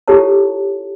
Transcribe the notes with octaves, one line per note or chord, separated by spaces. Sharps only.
E4 F4 G4 A4 C#5 A5